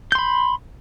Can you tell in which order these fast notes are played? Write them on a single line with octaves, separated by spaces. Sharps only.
G6 C6 B5